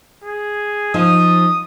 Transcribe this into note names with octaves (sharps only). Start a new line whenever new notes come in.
G#4
F3 D#4 D#6